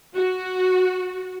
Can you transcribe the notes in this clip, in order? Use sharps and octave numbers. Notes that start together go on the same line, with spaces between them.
F#4